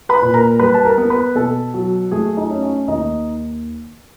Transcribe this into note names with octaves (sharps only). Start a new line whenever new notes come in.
B4 B5
A#2
A#4 A#5
G3 B4 B5
A5
A#4 A#5
B3
B4 B5
B2 A4 A5
F#3
A3 G#4 G#5
D#4 D#5
C#4
C#4 C#5
D#2 D#4 D#5